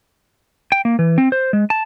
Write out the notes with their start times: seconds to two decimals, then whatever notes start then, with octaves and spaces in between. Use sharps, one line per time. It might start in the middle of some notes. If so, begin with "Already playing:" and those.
0.72 G5
0.85 A#3
0.99 E3
1.18 C4
1.32 C5
1.53 G#3
1.70 A5